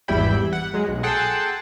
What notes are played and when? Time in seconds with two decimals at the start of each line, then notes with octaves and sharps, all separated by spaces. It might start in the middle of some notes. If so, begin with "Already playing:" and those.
0.08 G#1 E2 G3 E4 G5 B5
0.53 F#5
0.74 F#3 G#3
0.88 B1
1.03 G#4 A4 F#5 G5 A5 C6